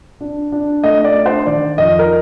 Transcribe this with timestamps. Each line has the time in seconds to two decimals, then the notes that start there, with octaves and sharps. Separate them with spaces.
0.21 D4
0.52 D4
0.84 A3 D#5
1.04 D5
1.15 D4
1.26 C5
1.47 D#3 D5
1.78 F2 D#5
1.99 A#4